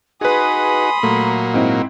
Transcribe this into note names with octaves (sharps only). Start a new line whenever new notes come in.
D#4 F#4 G#4 B4 G#5 B5 C6 D#6
A#2 F#3 A3 A#3 A#5
G#2 C4 E4 D#5